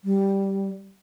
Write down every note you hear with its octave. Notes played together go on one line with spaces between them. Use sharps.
G3